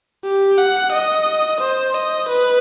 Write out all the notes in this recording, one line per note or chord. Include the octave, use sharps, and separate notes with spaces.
G4
F#5
D#5
C5
D#5
B4